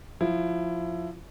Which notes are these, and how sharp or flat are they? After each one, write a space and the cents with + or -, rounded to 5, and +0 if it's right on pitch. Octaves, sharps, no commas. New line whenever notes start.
F3 +10 E4 +15